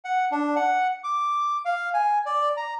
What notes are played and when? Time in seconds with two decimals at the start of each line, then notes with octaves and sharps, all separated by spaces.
0.05 F#5
0.32 D4
0.56 F#5
1.04 D6
1.65 F5
1.94 G#5
2.26 D5
2.57 A#5